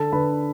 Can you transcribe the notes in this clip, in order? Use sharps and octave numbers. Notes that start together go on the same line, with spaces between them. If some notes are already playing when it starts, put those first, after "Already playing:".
Already playing: D3 A4 A5
D3 B4 B5